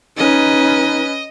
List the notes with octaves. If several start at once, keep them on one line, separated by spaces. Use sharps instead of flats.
C#4 D#4 B4 D#5